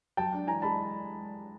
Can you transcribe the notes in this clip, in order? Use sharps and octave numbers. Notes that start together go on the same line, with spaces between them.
F#3 G5 A5
D4
E3 G#5 A#5
G#3 A5 B5